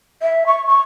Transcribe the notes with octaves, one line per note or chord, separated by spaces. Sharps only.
E5
C#6
C#6